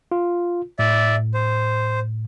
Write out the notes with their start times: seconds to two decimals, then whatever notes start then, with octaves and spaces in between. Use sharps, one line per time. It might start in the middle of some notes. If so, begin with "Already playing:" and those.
0.12 F4
0.79 A2 D5 E5
1.34 C5